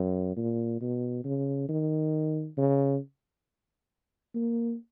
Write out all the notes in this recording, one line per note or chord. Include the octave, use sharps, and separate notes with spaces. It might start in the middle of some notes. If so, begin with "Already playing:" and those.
Already playing: F#2
A#2
B2
C#3
D#3
C#3
A#3